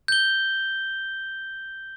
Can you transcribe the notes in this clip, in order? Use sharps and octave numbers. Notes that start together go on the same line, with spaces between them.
G6 G7